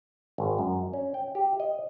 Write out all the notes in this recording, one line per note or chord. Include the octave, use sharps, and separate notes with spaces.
G#1
F#2
C#4
G5
G4
D#5